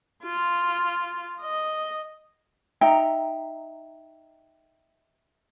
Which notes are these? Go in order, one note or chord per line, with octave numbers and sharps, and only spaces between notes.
F4
D#5
D#4 E5 G5 A#5